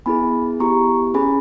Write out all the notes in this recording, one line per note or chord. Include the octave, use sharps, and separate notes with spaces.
B3 E4 G#4 G#5 B5
B3 E4 G4 A#5 C#6
C#4 G#4 G#5 B5